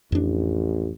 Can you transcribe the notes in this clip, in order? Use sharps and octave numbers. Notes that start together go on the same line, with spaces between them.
A1 F2 D4